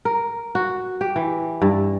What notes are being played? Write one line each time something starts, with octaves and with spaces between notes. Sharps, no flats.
A#4
F#4
G4
E3
G2